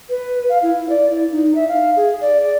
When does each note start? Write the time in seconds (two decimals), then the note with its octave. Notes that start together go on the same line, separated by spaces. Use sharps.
0.10 B4
0.49 F5
0.63 E4
0.89 D5
1.10 E4
1.32 D#4
1.55 E5
1.68 F5
1.96 G#4
2.21 D5
2.43 D5